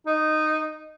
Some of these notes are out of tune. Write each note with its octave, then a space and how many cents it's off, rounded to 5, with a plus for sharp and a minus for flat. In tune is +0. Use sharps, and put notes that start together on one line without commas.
D#4 -10